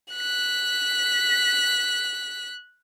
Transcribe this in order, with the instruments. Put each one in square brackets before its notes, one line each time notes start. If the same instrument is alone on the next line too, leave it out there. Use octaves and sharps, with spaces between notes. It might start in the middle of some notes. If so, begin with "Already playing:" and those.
[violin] F#6 B6